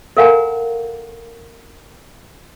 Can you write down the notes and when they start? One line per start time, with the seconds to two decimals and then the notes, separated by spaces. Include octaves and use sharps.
0.17 A4 A#4 F5 F#5 G#5 A#5